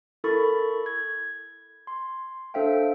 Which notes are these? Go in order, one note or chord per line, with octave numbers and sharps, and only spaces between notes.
E4 A4 A#4 B5 C#6 A6
G#6
C6
D4 A4 C5 E5 F5 G5